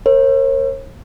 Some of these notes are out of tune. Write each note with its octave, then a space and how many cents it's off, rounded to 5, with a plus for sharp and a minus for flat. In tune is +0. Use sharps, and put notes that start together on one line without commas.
A#4 +0 C#5 -40